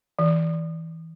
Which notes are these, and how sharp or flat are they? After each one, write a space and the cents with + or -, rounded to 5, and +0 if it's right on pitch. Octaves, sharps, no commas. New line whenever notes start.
E3 -25